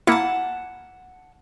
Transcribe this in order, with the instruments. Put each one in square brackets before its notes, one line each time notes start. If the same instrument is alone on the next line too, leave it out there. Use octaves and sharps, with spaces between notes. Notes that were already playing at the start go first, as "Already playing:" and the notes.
[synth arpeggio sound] A#3 E4 [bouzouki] F#5 A5